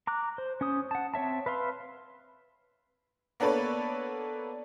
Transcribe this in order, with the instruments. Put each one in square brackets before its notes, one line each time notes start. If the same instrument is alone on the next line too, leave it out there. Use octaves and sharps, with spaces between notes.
[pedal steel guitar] A#5 D6 F#6
C5
C#4 C5 D#6
F#5 A5
C4 C#5 E5 A5
B4 E5 F5 C6
[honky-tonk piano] A#3 B3 D4 A4 B4 C#5